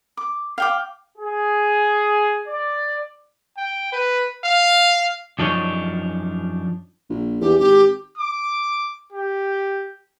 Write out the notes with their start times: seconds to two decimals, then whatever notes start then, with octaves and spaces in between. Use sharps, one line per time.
0.17 D6
0.58 F5 G5 D6
1.18 G#4
2.47 D5
3.57 G5
3.92 B4
4.44 F5
5.39 F#2 F3 D4 D#4 C#5
7.10 A#1
7.41 E2 G4
7.59 G#1 G4
8.18 D6
9.12 G4